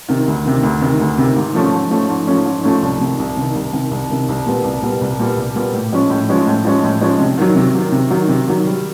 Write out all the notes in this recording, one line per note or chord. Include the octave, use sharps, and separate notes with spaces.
C3 D#3
D2
C3 D#3
D2
C3 D#3
D2
C3 D#3
G#2
F3 A3 C#4
G#2
F3 A3 C#4
G#2
F3 A3 C#4
G#2
F3 A3 C#4
C2
C3 D#3
C2
C3 D#3
C2
C3 D#3
C2
C3 D#3
C2
A#2 G3 B3
C2
A#2 G3 B3
C2
A#2 G3 B3
C2
A#2 G3 B3
A2
F3 G#3 C#4
A2
F3 G#3 C#4
A2
F3 G#3 C#4
A2
F3 G#3 C#4
C3
D#3 F#3
C3
D#3 F#3
C3
D#3 F#3
C3
D#3 F#3
G3